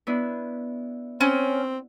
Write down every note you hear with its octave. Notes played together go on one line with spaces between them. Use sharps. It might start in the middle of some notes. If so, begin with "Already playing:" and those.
B3 D4 E4
C4 C#4